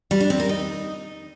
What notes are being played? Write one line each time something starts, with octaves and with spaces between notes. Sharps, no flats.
G3
D4
C4
A#4
D#4